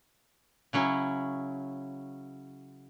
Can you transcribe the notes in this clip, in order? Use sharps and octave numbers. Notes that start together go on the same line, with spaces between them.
C#3 F#3 C#4 E4